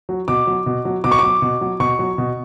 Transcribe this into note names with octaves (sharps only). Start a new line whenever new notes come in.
F#3
B2 D6
F#3
B2
F#3
B2 D6
C#6
F#3 D6
B2
F#3
B2 C#6
F#3
B2